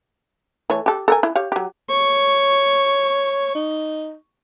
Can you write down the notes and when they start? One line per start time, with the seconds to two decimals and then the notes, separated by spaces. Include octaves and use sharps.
0.70 E3 A3 C#5
0.86 G4 A4
1.08 A4 A#4 G#5
1.23 E4
1.36 G4 C#5 F5
1.52 F#3 G4
1.89 C#5 C#6
3.55 D#4